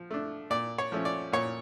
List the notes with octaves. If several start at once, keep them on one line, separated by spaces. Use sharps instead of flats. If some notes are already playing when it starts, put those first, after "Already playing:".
Already playing: F3
A3 D4
A#2 D5
C#5
F3 A3 C#4
D5
A#2 C#5